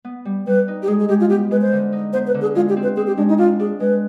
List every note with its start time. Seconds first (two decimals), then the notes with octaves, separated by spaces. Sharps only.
0.04 B3
0.25 G3
0.47 G3 B4
0.68 D#4
0.83 G4
0.88 G#3 G#4
0.99 G#4
1.09 G#3 G4
1.20 F4
1.30 B3 G4
1.51 G#3 B4
1.62 C5
1.72 D3
1.92 D#4
2.13 B3 C5
2.27 B4
2.34 D3
2.42 G#4
2.55 G#3 F4
2.69 G4
2.77 C4
2.83 B4
2.96 C4 G#4
3.07 G4
3.17 G#3 D4
3.29 D#4
3.38 D4 F4
3.59 D4 G#4
3.80 G#3 B4